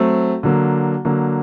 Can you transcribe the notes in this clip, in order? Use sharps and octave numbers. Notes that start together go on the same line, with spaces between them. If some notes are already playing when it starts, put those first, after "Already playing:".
Already playing: F#3 A3 C4
D3 F#3 A#3
D3 F#3 A#3